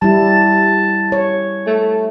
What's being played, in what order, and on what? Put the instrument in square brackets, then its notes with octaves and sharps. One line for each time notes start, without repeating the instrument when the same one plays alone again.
[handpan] G3 E4 [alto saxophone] A5
[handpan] C#5
[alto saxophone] A3